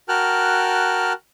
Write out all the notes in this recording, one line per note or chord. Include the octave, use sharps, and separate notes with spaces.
F#4 A#4 G5 A5 F6 F#6